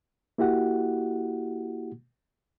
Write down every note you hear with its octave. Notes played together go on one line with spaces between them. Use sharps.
A#3 E4 F#4 G4 F#5